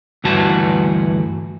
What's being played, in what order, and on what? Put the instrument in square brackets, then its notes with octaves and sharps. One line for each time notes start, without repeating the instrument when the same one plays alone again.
[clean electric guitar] D2 G2 E3 F#4 A5